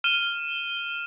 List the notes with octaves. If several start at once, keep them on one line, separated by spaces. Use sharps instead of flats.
F6 D#7 E7 G7